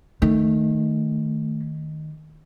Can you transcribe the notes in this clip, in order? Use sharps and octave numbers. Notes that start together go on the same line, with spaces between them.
D#3 A3